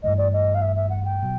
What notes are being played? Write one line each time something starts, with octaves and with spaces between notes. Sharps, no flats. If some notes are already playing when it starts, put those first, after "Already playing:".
G2 E3 A3 D#5
D5
D#5
F5
E5
E5
F#5
G5
B2 F#3